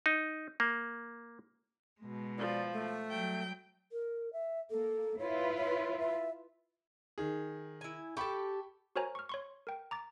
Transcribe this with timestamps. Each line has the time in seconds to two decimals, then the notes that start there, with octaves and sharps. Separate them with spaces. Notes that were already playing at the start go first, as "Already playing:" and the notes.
0.06 D#4
0.60 A#3
2.01 B2 G#3
2.39 F3 D5
2.73 A3
3.10 F#3 G3 G5
3.92 A#4
4.33 E5
4.70 A#3 A4
5.19 E4 F4 B4 C#5
5.58 C#5
5.99 E5
7.18 D#3 G#4
7.81 E4 G#5
8.17 G4 A4 G5 B5 C#6
8.96 F#4 A#4 C5 C#5 G#5 A#5
9.15 C#6 F6
9.29 C#5 C6 C#6
9.67 A#4 G5
9.91 A#5 D6 A6